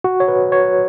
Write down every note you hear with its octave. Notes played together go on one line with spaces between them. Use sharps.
F#4
C#5
B4
C#5